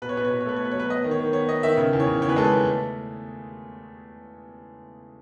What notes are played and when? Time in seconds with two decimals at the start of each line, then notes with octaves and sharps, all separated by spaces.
0.02 B2 B4
0.09 C#5
0.17 B2 B4
0.25 C#5
0.31 B2 B4
0.40 C#5
0.46 A3 B4
0.56 C#5
0.60 B2 B4
0.71 C#5
0.75 F#3
0.80 B4
0.90 B3 D#5
1.04 D#3
1.11 C#5
1.20 D#3
1.33 B3 C#5
1.49 B3 D#5
1.63 D#3 E5
1.77 C#3
1.93 E2
2.00 C#5
2.07 C#3
2.22 E2 C#5
2.29 B4
2.36 G#3 A4
2.44 B4
2.51 E2
2.65 A3